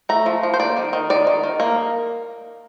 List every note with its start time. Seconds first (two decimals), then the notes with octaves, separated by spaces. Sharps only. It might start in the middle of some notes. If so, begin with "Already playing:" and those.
0.09 A3 A#5
0.26 F3
0.43 F3
0.54 C5
0.60 A#3 D5
0.77 D#3
0.93 D#3
1.10 D#3 D5
1.27 D#3
1.43 D#3
1.60 A#3